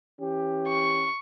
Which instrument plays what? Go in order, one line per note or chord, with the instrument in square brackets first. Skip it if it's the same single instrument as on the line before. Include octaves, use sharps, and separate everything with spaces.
[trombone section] E3 C#4 G4
[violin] C#6